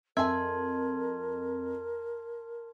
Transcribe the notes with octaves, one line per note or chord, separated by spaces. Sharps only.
F2 A#4 E5 G#5 A5 C6 G#6